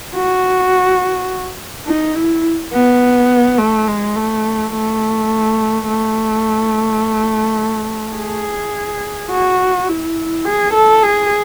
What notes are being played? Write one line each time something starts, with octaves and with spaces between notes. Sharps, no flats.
F#4
D#4
E4
B3
A3
G#3
A3
A3
A3
G#4
F#4
E4
G#4
A4
G#4